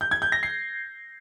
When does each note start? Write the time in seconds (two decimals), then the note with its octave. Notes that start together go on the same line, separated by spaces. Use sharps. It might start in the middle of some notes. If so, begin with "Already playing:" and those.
0.01 G6
0.11 G#6
0.22 G6
0.32 A#6
0.43 C7